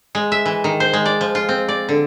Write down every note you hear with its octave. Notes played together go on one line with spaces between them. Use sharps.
G#3
E5
E3
D#3
C5
G#3
D5
F3
F4
C4
D5
D3